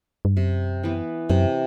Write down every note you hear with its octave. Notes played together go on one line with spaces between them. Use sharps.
G2
F#2 C3
E3 B3
F#2 C3